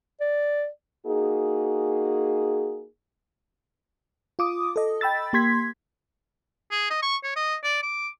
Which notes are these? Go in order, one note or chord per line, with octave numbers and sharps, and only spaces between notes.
D5
A#3 D#4 F#4 G#4
F4 D6 D#6
A4 D#5
G5 B5 E6 A6
A#3 G4 C6 G#6 B6
G#4
D#5
C#6
C#5
D#5
D5
D6